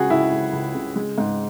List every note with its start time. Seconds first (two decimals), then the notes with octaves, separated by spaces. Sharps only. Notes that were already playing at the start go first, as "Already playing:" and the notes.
Already playing: C#2 C#3 F#4 G#4
0.10 C#2 E4
0.32 C#2
0.53 C#2
0.74 C#3
0.96 G#3
1.18 G#2